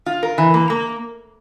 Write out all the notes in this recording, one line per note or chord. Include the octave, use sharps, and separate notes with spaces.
F4
A#4
E3
A#3
A#3